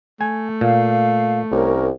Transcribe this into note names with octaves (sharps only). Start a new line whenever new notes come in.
A3 G#5
A#2 F5
C2 C#4 A#4